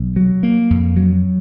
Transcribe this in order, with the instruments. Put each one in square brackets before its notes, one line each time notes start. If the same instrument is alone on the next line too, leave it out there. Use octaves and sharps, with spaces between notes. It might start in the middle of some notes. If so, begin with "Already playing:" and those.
Already playing: [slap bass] B1
F#3
A#3
F2
F#3